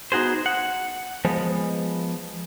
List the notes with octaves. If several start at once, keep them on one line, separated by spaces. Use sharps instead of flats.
B3 D#4 F#4 G#4 C5
F#5
F3 G#3 B3